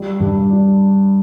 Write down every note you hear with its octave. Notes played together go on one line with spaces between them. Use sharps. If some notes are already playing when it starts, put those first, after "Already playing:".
Already playing: G3
G2
D4